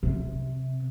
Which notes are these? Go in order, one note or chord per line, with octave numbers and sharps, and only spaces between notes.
C3